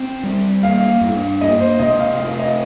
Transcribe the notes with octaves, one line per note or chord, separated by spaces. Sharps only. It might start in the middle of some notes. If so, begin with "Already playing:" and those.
Already playing: C4
G3
A#3 F5
G2
A#3 D#5
C5
C3 D#5
F5
A3 F5
D#5